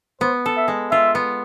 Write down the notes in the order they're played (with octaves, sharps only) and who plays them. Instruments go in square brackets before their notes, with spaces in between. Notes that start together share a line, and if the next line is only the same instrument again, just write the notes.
[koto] B3 [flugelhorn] C5
[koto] A4
[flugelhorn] E5
[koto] G#3
[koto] F4 [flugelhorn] E5
[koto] B3